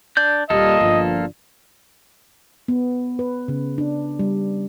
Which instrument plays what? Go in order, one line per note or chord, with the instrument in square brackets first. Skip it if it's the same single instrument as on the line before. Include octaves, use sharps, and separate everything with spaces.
[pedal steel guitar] D4 D5 G6
[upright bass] D#1 [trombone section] G3 [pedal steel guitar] A#3 F4 A4 [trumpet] D#5
[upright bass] G1 [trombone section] F3 D4
[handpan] B3
B4
C#3
D4
G3